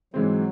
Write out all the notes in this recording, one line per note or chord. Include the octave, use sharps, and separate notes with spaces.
G#2 E3 F#3 G#3 C4